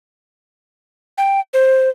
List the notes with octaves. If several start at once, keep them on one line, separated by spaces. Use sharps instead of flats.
G5
C5